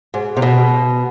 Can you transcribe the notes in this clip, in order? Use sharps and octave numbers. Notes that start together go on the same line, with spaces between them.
G#2
C3
B2